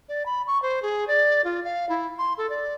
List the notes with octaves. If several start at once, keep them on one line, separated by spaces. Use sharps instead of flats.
D5
B5
C#6
C5
G#4
D5
F4
F5
E4
C6
A4
D5